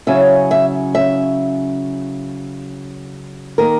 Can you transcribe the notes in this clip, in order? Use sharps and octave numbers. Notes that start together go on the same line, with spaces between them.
C#3 F#3 C#4 E4 E5
E5
E5
D#3 A#3 D#4 A#4